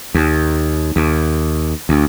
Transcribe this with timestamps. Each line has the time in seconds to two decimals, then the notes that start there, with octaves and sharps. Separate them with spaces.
0.15 D#2
0.96 D#2
1.89 D2